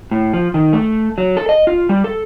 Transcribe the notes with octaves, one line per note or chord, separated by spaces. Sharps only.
A2
F3
D#3
A3
F#3
A4
D#5
F4
G3
A4